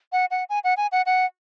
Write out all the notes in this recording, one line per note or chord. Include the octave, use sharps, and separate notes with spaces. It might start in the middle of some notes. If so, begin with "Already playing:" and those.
F#5
F#5
G#5
F#5
G#5
F#5
F#5